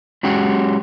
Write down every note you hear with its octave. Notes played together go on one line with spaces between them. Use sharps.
F#3 G#3 C#4 F#4 G4